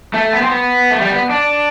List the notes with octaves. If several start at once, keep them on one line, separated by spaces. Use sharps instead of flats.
A3
B3
C4
B3
A3
G3
B3
D4